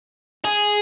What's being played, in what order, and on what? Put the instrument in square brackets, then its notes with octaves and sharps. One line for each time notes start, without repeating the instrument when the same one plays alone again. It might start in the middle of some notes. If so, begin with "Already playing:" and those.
[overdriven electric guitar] G#4